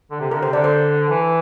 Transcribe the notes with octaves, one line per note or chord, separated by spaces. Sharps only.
D3
C3
D3 A#4
C3 C5
D3 D5
C5
E3